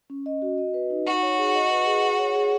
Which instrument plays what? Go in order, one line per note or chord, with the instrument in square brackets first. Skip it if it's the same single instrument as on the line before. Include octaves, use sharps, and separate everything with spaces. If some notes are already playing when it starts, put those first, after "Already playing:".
[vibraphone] C#4
D#5
F#4
D#5
B4
D#4
[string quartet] F#4 [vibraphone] F#5
[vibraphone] C#5
G#4
D#5
B4
G#4
F#5
C#5
G#4